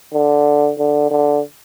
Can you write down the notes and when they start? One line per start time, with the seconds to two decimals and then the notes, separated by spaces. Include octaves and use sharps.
0.13 D3
0.78 D3
1.11 D3